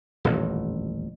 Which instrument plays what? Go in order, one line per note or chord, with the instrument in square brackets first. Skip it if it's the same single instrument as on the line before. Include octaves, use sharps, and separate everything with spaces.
[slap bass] D#1 A1 F2